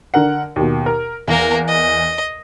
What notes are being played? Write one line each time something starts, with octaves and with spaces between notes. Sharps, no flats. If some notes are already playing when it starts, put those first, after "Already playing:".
D3 A#4 F#5
D#2 B2
A#4
E2 A#3 A#4
D#5